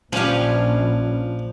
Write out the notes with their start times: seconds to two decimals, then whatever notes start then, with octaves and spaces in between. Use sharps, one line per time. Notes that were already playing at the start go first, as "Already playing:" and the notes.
0.13 A#1 F3 C#4 D4 G4 B4 F5